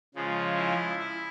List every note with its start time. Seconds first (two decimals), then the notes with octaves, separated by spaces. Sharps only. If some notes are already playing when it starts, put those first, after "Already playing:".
0.15 C#3 F3 G#3
0.56 E4
0.98 E4